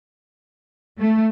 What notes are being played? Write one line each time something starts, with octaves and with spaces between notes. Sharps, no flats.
A3